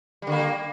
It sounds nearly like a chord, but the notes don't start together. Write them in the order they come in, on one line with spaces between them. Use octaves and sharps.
G3 D3 A#3